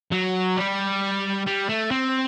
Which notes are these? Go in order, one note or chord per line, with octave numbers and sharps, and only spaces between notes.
F#3
G3
G3
A3
C4